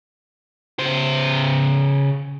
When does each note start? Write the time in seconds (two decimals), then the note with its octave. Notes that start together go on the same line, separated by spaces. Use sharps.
0.79 C#3 C5